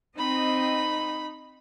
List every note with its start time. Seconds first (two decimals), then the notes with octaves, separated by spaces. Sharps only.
0.17 C4 D#4 D#5 B5